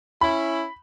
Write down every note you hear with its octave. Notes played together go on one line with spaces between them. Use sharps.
C#4 E4 B5